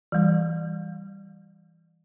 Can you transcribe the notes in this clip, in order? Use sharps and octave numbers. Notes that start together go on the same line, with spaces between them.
E3 G3